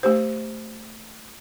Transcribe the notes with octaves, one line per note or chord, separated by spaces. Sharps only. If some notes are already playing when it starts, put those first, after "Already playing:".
A3 G4 C5